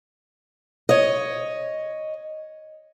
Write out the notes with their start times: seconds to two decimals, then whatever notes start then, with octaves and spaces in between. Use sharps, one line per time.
0.89 C#5 D#5